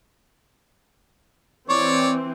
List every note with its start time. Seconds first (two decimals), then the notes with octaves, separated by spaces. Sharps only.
1.69 E3 C4 C#5 D5 C#6